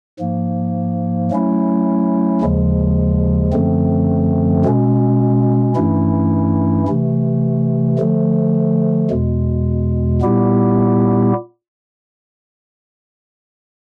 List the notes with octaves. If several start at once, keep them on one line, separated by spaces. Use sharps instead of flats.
G#2 F3 A#3
F#3 A3 C#4 E4
D#2 C#3 F3 G#3
F#2 D3 F3 A3 C4
B2 G#3 C#4
G2 E3 A3 C#4 E4
C3 E3 A3
D3 F3 A3
E2 B2 G#3
A#2 G3 B3 E4 G4